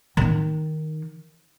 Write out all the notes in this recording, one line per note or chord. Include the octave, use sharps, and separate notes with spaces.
D#3 D#4